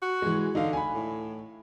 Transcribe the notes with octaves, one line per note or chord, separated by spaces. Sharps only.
F#4
E3 G#3
D3 D#4 F5
G#5 B5
A2